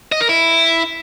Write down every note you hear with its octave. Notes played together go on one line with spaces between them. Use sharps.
D#5
A#4
E4